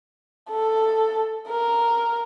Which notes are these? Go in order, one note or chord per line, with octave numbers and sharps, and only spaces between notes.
A4
A#4